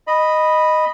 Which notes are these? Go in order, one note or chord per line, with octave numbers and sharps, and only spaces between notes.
D#5 B5